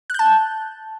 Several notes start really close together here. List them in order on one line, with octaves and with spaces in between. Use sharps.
F#6 G6 A5